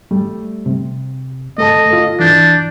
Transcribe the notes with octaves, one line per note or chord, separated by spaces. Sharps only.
G3 A3
C3
A3 A4 D#5 A5
F4 A4
E3 D4 G6